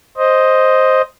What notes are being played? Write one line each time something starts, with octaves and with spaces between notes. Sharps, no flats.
C5 D#5